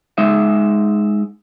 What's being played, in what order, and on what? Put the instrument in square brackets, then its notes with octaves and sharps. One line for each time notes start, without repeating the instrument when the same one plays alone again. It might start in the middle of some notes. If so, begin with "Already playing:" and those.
[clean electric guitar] G#3 D#4 E5